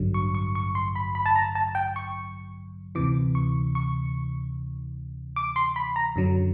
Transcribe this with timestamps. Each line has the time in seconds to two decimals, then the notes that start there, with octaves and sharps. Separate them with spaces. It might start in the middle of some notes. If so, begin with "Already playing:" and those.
Already playing: A1 G2 D3 F#3
0.14 C#6
0.35 C#6
0.55 C#6
0.75 C6
0.96 B5
1.15 B5
1.26 A5
1.36 A#5
1.55 A5
1.75 G5
1.96 C#6
2.95 D2 C3 E3 D6
3.35 C#6
3.75 C#6
5.36 D6
5.56 C6
5.76 B5
5.96 A#5
6.16 F#2 D3 F#3